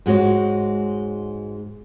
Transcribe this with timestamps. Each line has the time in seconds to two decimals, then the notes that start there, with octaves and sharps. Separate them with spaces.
0.06 G#2 G#3 F#4 C#5